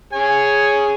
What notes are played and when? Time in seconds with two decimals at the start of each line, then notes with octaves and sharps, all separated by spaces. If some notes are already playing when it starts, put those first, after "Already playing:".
0.13 G#4 C#5 G#5